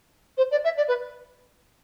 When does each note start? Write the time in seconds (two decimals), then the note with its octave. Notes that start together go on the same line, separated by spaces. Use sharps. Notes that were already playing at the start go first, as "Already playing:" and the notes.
0.37 C5
0.51 D5
0.64 E5
0.77 D5
0.88 B4